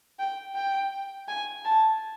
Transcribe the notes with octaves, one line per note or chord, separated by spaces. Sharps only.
G5
G5
G#5
A5